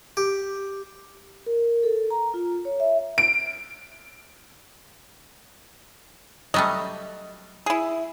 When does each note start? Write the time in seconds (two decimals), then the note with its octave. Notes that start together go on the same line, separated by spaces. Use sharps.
0.17 G4
1.46 A#4
1.83 A4
2.10 A#5
2.34 F4
2.65 C#5
2.80 E5
3.18 D7
6.54 F#3 G3 A3 D#5
7.66 E4 G#4